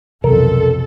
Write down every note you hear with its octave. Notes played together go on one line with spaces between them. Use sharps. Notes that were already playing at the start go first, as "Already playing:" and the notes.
B1 F2 C3 E3 F#3 A4 A#4